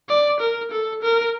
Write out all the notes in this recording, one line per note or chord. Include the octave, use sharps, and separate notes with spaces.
D5
A#4
A4
A#4